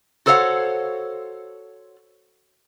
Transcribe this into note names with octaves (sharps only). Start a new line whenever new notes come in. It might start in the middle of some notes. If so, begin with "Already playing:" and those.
F#4 A4 C5 C#5 F5 F#5